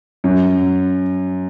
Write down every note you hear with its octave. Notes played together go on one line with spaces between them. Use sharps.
F#2